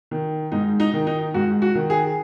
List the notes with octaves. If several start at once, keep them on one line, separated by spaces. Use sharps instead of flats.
D#3
G#2 D#4
D#4
D#3
D#4
G#2 F#4
F#4
D#3
G#4